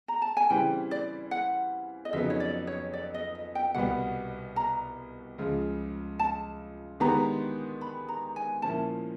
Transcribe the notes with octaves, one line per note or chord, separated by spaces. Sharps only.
A#5
A5
G#5
C#3 E3 G3 C4 G5
D5
F#5
D#5
F2 C#3 F#3 B3 D#4 E5
C#5
D5
C#5
D5
D#5
D#5
G5
C2 B2 G3 B3 F#5
A#5
C#2 C#3 F3
A5
D#3 G#3 B3 D4 G4 A#5
B5
A#5
G#5
A#2 F3 A#3 C#4 E4 A5